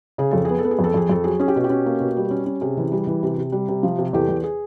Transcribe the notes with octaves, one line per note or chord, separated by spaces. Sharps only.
C#3 G#4
F2 A4
B3 G#4
A4
B3
G#4
F2
A4
F2 G#4
F2 A4
F#3 G#4
C#4 G#4
G4
B2
G4
C#4
A#3
B2
G3
C#4
C#4
C3 G#4
E3
G3
E3
C3
C3
G3
C3
F3
C3
E2 G4 A4
E2
G#4